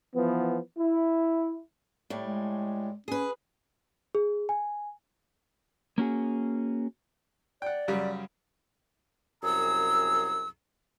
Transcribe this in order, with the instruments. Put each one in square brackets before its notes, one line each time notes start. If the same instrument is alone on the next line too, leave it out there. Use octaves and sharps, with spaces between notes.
[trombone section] E3 F3 B3
E4
[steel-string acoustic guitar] A2 G3
[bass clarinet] G#3
[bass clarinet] C#4 [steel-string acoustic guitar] G#4 B4
[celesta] G#4
G#5
[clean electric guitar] A#3 C#4 F#4 G#4
[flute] D5 [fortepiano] F#5 G5
[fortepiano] F#2 C#3 G3
[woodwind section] C2 F#2 G#4 A#5 E6